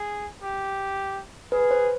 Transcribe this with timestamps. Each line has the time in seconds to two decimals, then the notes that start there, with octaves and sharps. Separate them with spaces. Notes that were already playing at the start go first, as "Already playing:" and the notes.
Already playing: G#4
0.43 G4
1.52 G#4 B4
1.71 C5